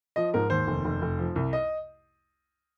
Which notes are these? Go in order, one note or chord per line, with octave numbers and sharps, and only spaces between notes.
F3 D#5
G#2 A#4
D#2 C5
F1
F1
F1
F3
C2
D#5